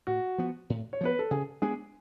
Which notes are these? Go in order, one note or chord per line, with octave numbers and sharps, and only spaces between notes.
A2 F#4
F3 B3
A2
C#5
F3 B3 B4
A4
C#3 G#4
G#3 B3 D4 G#4